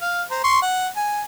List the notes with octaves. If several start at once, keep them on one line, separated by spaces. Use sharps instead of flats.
F5
C5 A#5
C6 C#6
F#5
G#5